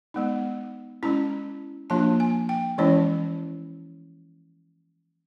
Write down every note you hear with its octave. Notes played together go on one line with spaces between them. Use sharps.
G#3 B3 D#4
G#3 C#4 E4 A#5
F3 A#3 D4 F4 A5
G#5
G5
E3 G#3 C#4 E4 C#5